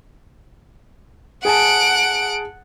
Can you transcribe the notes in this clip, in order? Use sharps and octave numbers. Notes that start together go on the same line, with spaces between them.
G#4 F#5 G#5 A5 D7